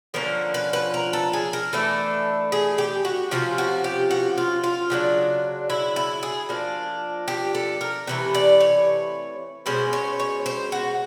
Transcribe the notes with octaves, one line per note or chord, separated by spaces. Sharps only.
D3 F3 A#3 C#4 A#4
B4
B4
A#4
A4
G#4
A#4
E3 A3 D4 A4
G#4
G4
F#4
C3 F3 A#3 C#4 F4
F#4
G4
F#4
F4
F4
C#3 F#3 A3 D4
E4
E4
G#4
F3 A#3 D4
G4
A4
A#4
C3 E3 A3 B4
D5
C#5
B2 G#3 C#4 C5
C#5
C#5
C5
F#4